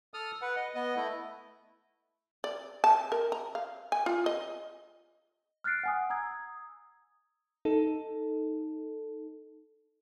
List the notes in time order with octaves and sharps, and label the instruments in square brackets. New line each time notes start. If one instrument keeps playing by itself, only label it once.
[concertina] A4 D#6 F6
B4 F#5
D#5
B3 D#5
A3 E4
[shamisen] D5
A5
A#4
A#5
F5
G#5
F4
D#5
[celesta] F6 F#6 A6 C7 D7
F#5 G#5 D#6
A#5 D#6 E6 G#6
[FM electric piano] D#4 A4